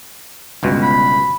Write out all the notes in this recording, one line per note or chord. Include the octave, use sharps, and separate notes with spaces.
G1 C#2 B2
B5